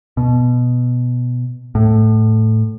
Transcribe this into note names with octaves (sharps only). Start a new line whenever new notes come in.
B2
A2